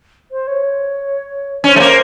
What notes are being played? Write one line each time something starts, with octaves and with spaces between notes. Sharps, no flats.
C5
C#5
C#4 C5
A3
A#3